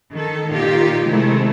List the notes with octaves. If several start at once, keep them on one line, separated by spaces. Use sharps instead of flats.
D#3 A4
A#2 D#3 D#4 F4 G4
C3 D#3 G#3 A3 E4